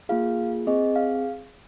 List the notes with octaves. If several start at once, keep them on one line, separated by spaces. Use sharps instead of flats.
A#3 F4 G#4 F5
C4 G#4 D#5
F5